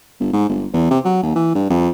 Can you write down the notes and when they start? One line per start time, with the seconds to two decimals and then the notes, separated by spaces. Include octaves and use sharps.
0.20 G1
0.33 G#2
0.49 G1
0.74 E2
0.91 C3
1.05 F#3
1.23 D#2
1.36 E3
1.55 G2
1.70 F2